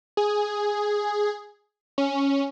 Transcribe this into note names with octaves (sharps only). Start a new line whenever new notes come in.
G#4
C#4